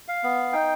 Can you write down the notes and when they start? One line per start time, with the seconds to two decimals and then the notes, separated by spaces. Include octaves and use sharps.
0.08 F5
0.24 B3
0.53 D#4 G5